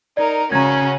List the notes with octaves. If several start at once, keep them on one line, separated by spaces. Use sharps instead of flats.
D#4 A#4 D5
C#3 C#4 F#4 A#5 G#6